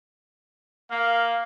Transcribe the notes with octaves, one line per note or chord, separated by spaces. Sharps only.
A#3 F5